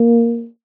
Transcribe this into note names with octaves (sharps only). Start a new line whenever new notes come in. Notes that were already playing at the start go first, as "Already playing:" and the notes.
Already playing: A#3